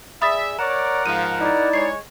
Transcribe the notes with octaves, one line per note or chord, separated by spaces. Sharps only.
G#4 D5 E5 B5 D#6 A6
A#4 C#5 D5 F#5 A#5
G#2 F3 F5 D#7
D#4 E4 D5
G#3 C#5 C7